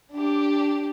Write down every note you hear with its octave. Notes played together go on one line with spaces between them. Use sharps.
D4 G4